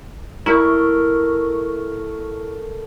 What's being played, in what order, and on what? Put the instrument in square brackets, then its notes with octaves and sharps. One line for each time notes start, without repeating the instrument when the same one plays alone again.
[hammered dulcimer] A3 A#4 C#6 [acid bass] E4